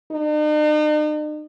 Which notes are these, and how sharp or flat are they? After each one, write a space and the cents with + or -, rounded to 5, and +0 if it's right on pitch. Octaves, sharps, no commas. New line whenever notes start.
D#4 -45